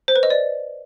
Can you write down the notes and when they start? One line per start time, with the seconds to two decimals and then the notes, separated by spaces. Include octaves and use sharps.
0.08 C5
0.16 B4
0.23 D#5
0.30 D5